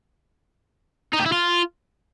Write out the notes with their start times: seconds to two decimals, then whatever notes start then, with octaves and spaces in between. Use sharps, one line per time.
1.13 D#4
1.20 G4
1.26 E4
1.32 F4